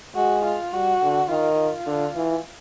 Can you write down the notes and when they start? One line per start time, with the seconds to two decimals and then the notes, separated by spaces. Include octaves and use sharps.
0.15 G#3 F#4
0.44 F4
0.73 G3 F#4
1.02 D3
1.30 D#3 F4
1.58 F4
1.87 D3
2.15 E3